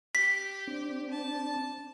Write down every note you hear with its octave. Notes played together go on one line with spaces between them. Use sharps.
G4 B6
C4 D4
A5